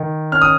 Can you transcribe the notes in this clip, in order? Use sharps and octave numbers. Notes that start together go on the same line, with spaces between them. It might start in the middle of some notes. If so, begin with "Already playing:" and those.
Already playing: D#3
C#4 F6
D#6